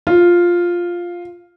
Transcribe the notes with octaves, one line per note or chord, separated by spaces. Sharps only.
F4